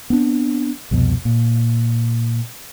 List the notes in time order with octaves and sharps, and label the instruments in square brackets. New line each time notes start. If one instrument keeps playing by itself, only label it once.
[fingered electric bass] B3 C4 D4
C2 F2 B2
A#2